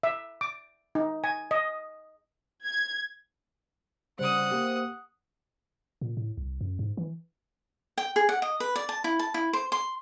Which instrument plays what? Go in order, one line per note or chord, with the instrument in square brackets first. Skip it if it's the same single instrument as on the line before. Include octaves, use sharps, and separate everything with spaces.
[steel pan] E5
D6
D#4
G#5
D#5
[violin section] G#6
[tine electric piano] C#3 G3 [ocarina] C5 [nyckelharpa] F#5 D#6
[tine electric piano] A#3 G4
[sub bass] A#2
A2
C2
F#2
G#2
E3
[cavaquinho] G5
G#4
F#5
D#5
B4
D5
A5
E4
A5
E4
C5
C6